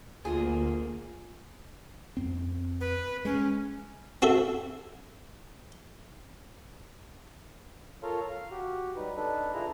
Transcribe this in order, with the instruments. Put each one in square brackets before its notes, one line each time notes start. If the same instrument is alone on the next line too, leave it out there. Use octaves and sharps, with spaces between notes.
[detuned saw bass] D2 [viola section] A#3 [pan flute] F4 [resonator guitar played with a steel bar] G#4
[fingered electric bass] F2 C4
[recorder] B4
[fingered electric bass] G#3 [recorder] C#4
[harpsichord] C4 F#4 A4 E5
[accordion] F4 A4 A#4 C#5 F5 C6
F5
F#4 G4
F#3 G3 D#4 B4
D4 D#4 A4 B4
D4 E4 F4 G#4 A#5